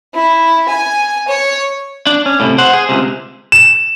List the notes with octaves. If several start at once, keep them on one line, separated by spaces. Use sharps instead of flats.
E4
G#5
C#5
D4
C#4
A2 C3
C5 F#5
G#4
C#2 C3
E7